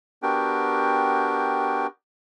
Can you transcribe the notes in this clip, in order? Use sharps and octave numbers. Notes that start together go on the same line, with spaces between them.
B3 D4 F#4 G4 A#4 G5